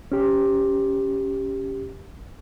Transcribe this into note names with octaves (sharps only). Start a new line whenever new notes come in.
C#4 G4